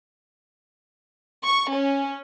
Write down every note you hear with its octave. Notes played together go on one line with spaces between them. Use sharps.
C#6
C#4